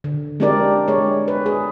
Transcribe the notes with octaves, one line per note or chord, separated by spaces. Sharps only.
D3
G#3 C4 D4 G4 A#4 D5
G#3 C#5
B4
G#4